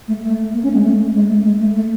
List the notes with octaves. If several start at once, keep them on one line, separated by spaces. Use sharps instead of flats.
A3
A3
A#3
C#4
G#3
A3
G#3
A3
G#3
A3
A3